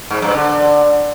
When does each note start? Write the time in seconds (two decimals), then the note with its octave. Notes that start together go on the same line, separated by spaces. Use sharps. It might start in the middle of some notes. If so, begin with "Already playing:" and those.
0.11 G#2
0.22 G2
0.34 D3